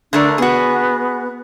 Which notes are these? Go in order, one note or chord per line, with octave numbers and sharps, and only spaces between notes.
D3 A3 D4 A#4
B3 F#4 G#4